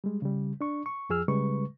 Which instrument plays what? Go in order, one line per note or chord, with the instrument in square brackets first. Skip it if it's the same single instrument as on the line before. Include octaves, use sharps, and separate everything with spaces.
[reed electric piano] G3 G#3
C#3 G3
D4 C#6
C#6
F2 F3 G#4 E6 F6
C#3 G3 G#3 B4 C#6